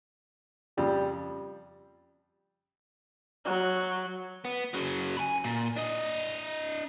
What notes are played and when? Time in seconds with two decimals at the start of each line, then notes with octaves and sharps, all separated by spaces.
0.78 F2 C#3 G3
3.45 F#3
4.45 B3
4.74 C#3 F#3
5.17 G#5 B5
5.44 A#2
5.76 D4 D#5